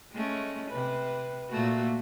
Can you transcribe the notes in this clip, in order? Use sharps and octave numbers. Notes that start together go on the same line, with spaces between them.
G#3 A3 C#4
C3 B4
A#2 A3 F#4